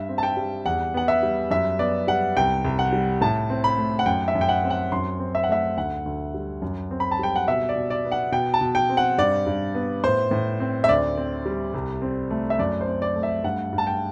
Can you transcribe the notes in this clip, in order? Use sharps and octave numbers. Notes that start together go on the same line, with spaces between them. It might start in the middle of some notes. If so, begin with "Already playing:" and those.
Already playing: G2 E5
C4
A5
G5
G3
E2 F#5
B3 F#5
E5
G3
F#2 E5
B3 D5
G3 F#5
C2 G5
C2
F#5
G3
A2 A5
C4
B5
A3
F#5
F#2 G5
E5
F#2
G5
F#5
C4
F#5
F#2 C6
C4
E5
F#5
A3 E5
D2 F#5
D2
G3
F#2
C4
B5
A5
G3 G5
F#5
B2 E5
D5
B2
D5
B3
F#5
B2 G5
A5
B2
G5
C4
F#5
G2 D5
G2
B3
A2 C5
A2
C4
E5
D2 D5
C4
G3
C2
C4
A3
E5
F#2 D5
C5
C4
D5
A3
E5
G2 F#5
G2
A5
G5